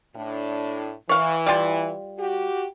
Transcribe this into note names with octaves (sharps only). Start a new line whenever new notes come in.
A2 D4
E3 C#5 F5
G3 F4
F#4 G4